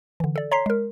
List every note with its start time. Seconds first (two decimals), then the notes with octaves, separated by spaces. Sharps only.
0.20 D3 E3
0.36 A4 D5
0.51 C#5 A#5 C6 B6 C7
0.66 G#3 A#4